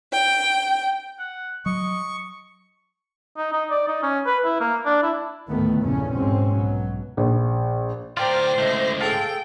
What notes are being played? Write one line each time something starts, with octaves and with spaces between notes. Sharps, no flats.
G5
F#5
F#3 D#5 C#6
D#4
D#4
D5
D#4
C#4
B4
E4
A#3
D4
E4
D2 A2 D#3 A3 B3
A#1 E2 G2 C#3 A3 C#4
G#2 B2 C4 C#4
B1 B2 F#3
A#1
A2 F4 G4 A#4 C5 D5 G5
C#2 A2 A3 D#5
G#4 A4 F5 G5 A5